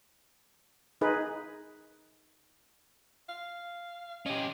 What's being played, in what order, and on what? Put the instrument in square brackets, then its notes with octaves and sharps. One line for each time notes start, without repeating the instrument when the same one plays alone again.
[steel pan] D#4 G#4 B4
[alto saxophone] F5
[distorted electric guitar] C#4 G4 [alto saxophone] D#5